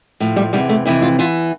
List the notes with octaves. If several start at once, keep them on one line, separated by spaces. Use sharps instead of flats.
A2 F3
G3
E2 C3 E3 G3
A3
F2 C3 E3 E4
F4
E2 E3 F4